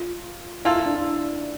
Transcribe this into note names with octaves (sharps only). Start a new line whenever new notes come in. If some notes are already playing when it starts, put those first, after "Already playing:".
Already playing: F4
A#3 E4 F4 A4
E4
D4
D4